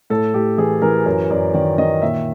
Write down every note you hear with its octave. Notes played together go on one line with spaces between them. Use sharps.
A2 A4
A2 G4
E3 G#4
E3 A#4
F#2 A#4
F#2 D5
D#3 D5
D#3 D#5
A#2 E5